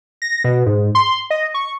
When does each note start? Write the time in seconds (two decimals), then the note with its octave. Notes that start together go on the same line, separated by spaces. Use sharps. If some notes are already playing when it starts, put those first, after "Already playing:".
0.22 A#6
0.44 B2
0.66 G#2
0.95 C6
1.30 D#5
1.54 C#6